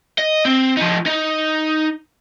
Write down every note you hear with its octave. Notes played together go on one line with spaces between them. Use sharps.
D#5
C4
F3 D#4
D#4